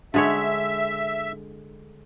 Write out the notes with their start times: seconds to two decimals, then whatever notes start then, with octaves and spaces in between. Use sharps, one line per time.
0.14 D3 G#3 C#5 E5